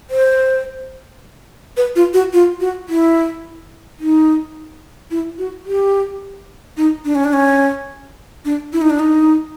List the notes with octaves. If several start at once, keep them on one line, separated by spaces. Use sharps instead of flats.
C5
B4
F4
F#4
F4
F#4
E4
D#4
E4
F#4
G4
D#4
D4
C#4
D4
C#4
D4
E4
D#4
D4
D#4